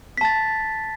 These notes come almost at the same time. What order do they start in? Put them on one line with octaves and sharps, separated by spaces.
B6 A5 A6